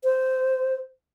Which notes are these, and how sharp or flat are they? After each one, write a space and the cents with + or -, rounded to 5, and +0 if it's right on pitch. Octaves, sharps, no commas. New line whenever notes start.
C5 -10